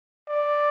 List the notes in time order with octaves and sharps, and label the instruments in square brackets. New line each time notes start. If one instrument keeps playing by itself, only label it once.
[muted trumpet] D5